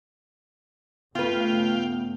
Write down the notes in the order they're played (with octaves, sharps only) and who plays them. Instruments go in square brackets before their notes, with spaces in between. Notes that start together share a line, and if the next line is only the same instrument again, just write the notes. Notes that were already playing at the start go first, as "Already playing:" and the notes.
[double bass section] G2 C#3 A3 [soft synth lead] B3 [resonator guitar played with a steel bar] F4 B4 [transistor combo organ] F5 G5